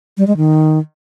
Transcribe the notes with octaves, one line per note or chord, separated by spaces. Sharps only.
G3
G#3
D#3